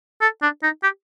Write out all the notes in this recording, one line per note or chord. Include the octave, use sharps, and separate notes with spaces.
A4
D4
D#4
G4